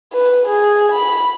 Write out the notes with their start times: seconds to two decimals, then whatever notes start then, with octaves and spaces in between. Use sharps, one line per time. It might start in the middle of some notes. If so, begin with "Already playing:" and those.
0.13 B4
0.46 G#4
0.92 B5